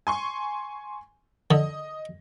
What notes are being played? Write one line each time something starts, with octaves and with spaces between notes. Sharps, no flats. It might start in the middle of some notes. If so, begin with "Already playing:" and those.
G#5 C6 C#6
D3 D#5